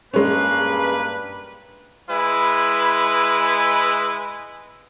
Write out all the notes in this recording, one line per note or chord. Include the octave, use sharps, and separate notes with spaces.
G2 G#3 A#3 C#4 B4
G#3 E4 B4